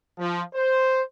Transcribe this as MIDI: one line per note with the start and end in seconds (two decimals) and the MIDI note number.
0.19 0.42 53
0.55 1.02 72